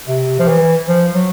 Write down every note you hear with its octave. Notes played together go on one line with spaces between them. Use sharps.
C3
F3
E3
F3
F#3